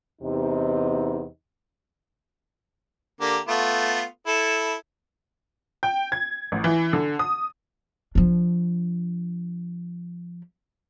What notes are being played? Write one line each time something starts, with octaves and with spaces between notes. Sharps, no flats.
E2 C3 D#4
D3 A#3 G4
A3 B3 F4
E4 A4
G5
G#6
A1
E3
D3
D#6
F3 D4